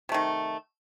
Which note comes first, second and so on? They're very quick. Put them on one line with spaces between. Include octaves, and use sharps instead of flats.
C3 A3 D#3